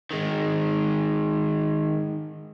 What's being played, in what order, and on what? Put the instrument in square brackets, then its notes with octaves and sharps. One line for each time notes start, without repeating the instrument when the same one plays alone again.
[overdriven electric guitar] D#3 G#3